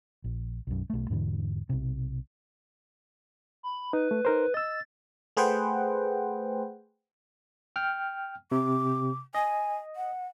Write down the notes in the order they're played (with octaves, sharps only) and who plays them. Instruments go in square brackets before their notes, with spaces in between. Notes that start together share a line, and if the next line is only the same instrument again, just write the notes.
[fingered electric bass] A#1
B1 F#2
B1 A3
E2 G#2 D3 E3
B1 C3
[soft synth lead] B5
[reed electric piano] D#4 [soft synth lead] B4
[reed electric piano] A3
D#4 A#4 C5
[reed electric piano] D#5 E6 [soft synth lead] A6
[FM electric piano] A3 G#4 B4 C5 F#5 G5
[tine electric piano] G5 F6
[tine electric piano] C3 [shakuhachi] D6
[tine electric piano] D#5 [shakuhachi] G#5
[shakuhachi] F#5